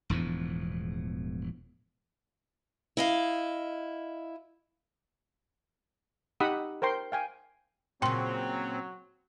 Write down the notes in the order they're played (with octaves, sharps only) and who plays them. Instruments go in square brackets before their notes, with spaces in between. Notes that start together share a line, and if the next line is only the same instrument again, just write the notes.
[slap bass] E1 E2 A2 F3
[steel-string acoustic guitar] E4 D#5 F5
[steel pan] D#4 G4 F#5 B5 D#6 E6
A#4 C5 G5 C6
F5 G5 G#5
[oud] A#2 C#3 [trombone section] F#3 [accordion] C4 [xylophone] G5 C6